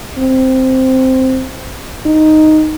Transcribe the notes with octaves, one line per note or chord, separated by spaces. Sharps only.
C4
D#4